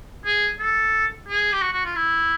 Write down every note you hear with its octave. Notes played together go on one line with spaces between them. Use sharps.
G#4
A4
G#4
G4
F#4
F#4
F4
E4